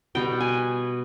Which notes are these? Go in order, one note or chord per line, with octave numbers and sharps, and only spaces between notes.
B2 G3 B3 G5
G#5